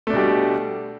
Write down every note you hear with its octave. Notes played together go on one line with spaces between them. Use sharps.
B2 G3 A3 D4